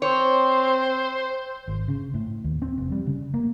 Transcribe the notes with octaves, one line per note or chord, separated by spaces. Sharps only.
C4 C5 C#5
G#1
C#3
A2
D#2
C4
F1
G3
C#3
A#3